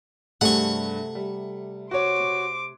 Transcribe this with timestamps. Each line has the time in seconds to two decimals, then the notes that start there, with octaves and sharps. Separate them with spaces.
0.41 G2 C3 A3 G#4 F#5 C#6
1.15 G3
1.91 F#4 C5 C#5 D6